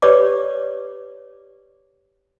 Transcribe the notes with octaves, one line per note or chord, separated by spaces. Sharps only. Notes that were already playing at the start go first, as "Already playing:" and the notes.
G4 B4 C#5 D5 D6